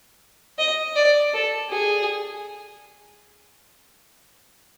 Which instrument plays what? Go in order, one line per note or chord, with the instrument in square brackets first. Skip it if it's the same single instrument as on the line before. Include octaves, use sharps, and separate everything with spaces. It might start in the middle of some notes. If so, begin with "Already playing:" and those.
[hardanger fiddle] D#5
D5
A4
G#4